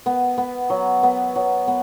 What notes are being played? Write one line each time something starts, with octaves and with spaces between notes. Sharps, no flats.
B3
B3
F#3
B3
F#3
B3